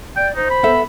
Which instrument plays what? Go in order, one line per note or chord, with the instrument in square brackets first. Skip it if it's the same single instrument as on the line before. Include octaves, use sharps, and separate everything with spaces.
[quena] D5 [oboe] G5
[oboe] D#4 [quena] C5
[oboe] B5
[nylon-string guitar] B3 A4 E5